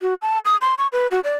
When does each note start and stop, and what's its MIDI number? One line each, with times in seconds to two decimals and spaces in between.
0.02 0.14 66
0.22 0.38 81
0.45 0.57 87
0.61 0.74 84
0.78 0.87 85
0.92 1.07 71
1.11 1.20 66
1.24 1.37 74